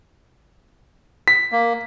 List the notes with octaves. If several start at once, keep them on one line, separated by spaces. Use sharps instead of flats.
B6
A#3